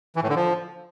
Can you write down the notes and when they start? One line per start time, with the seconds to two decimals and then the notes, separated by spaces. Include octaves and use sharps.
0.16 E3
0.23 A2
0.29 D3
0.36 F3